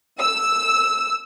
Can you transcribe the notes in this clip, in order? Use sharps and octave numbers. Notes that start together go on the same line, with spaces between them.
E6